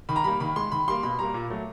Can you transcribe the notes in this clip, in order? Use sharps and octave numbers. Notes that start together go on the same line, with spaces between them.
D#3 B5
A#5
G3 A#3 B5
D#3 B5
G#3 C6
D#3 B5
G3 A#3 C6
B2 B5
G3 A#3 A#5
A#2
F#3 A3